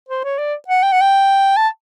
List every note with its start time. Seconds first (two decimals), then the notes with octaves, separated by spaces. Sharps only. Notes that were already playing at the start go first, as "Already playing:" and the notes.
0.09 C5
0.24 C#5
0.39 D5
0.68 F#5
0.83 G5
0.92 F#5
1.01 G5
1.57 A5